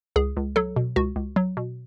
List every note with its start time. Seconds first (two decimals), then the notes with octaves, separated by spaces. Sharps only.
0.16 C#2 G#4
0.37 C#2
0.56 F#3 A4
0.76 B2
0.96 C#2 F#4
1.16 C#2
1.36 F#3
1.57 B2